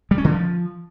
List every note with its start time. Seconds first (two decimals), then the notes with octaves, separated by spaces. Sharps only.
0.11 G3
0.18 C#4
0.24 D3
0.31 F3